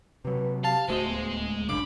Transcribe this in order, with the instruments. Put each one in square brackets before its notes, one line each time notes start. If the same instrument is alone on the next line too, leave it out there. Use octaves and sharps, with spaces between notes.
[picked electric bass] C3 F#3 [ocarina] B4
[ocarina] G4 [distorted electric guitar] F5 [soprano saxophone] A5
[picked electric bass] D1 C#2 A3 [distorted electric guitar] G#3 D#5 [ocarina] F#4 [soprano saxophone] C5
[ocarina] B3
[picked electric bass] G#1 F#2 C#3 [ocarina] D4 [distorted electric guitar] B5 [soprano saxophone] D6